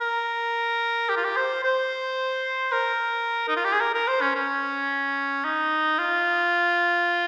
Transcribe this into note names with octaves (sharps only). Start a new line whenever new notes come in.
A#4
G4
F4
G4
C5
C5
A#4
D#4
F4
G4
G#4
A#4
A#4
C5
C#4
C#4
D#4
F4